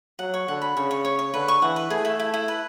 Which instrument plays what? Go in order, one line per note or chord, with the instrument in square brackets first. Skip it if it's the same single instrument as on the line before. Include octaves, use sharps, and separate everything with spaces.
[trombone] F#3 [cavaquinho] F#5
[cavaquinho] C#5
[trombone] D3 [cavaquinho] F#5
[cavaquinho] B5
[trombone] C#3 [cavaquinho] C#5
[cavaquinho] C#5
C#5
C#5
[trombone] D3 [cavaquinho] B4
[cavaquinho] C#6
[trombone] E3 [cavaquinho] F#5
[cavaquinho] B4
[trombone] A3 [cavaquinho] G#4
[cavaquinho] E4
E4
E4
B4